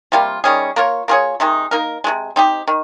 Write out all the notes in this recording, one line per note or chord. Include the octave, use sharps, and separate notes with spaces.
C3 G3 A#3 F4
D#3 G3 C#4 G#4
A#3 F4 A#4 C#5
A#3 F4 G#4 C#5
C3 D#3 G#3 D#4
A#3 D#4 A#4
C3 F3 G#3
C4 D#4 G4
D#3